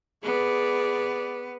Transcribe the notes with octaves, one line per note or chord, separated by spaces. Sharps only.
B3 G#4 D5